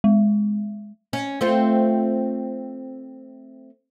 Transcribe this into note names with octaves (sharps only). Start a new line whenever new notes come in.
G#3
C#4
A3 C4 F4